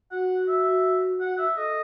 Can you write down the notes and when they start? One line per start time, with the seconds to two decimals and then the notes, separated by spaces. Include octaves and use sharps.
0.11 F#4 F#5
0.48 E5
1.20 F#5
1.38 E5
1.56 A4 D#5